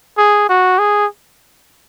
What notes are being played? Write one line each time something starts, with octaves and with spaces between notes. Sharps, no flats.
G#4
F#4
G#4